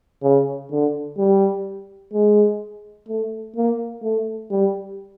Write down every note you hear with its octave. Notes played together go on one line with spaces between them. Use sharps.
C#3
D3
G3
G#3
A3
A#3
A3
G3